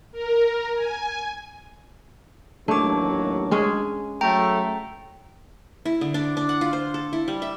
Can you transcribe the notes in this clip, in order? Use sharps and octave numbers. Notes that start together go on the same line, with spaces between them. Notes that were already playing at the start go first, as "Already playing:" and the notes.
A#4
G#5
A1 D#2 F#3 A3 D4 C#5 D6
G#3 C#4 G#4
F#3 A3 G5 A#5
E4
D3
D4
D4
F#5
F4
C5
A4
E4
G3
E5